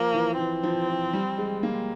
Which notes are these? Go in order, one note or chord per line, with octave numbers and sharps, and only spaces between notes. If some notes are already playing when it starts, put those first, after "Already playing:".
Already playing: F3 A#3
E3
E3 C4
F3
F3
G3
G#3
A#3